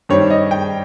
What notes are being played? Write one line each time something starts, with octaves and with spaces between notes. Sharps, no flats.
G2 D#3 G3 C4 C#5
D#5
G5